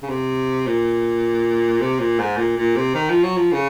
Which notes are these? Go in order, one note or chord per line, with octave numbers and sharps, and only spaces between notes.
C#3
C3
A#2
C3
A#2
G#2
A#2
A#2
C3
D#3
F3
F#3
F3
C#3